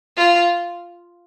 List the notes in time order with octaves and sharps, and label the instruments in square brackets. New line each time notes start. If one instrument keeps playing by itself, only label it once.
[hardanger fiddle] F4